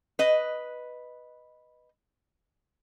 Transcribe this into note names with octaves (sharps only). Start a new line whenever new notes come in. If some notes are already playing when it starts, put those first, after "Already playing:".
B4 D#5